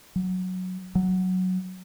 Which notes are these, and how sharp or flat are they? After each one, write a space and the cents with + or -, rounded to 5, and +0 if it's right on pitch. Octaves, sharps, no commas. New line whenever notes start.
F#3 -5
F#3 +0